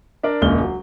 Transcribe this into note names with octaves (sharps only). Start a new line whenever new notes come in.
D4 A#4 D5
E1 C#2 A#2 C#3 F6 G7
F#3